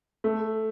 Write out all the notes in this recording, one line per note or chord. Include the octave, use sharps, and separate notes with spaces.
A3